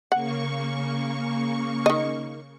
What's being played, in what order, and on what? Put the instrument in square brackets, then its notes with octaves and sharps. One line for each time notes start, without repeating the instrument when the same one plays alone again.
[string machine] C#3 A#3 C#6 [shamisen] F#5
[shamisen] D#3 D#5